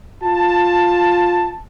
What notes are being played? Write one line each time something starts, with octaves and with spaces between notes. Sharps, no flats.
F4 A5